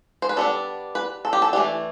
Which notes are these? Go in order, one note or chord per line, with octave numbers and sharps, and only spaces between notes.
C5
B4
G3 B3 D4 A4
B4
A4
G4
A4
E3 A3 D4 G4